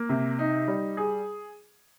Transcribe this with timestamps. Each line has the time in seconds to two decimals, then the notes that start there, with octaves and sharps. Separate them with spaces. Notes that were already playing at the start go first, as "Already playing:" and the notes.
Already playing: A#3
0.09 C3
0.39 D#4
0.68 G3
0.97 G#4